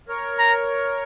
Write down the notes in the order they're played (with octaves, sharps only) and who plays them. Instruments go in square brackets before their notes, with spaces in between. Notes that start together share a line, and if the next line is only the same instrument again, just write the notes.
[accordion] A#4 C#5
[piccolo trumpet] A#5